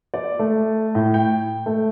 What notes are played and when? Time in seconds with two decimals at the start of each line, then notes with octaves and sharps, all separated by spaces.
0.14 D5
0.39 A3
0.95 A2
1.14 G5
1.66 A3